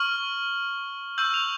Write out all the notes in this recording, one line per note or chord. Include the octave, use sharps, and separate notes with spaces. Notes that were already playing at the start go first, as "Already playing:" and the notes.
Already playing: C#6 F6 F#7
C#6 E6 G6 F#7
F7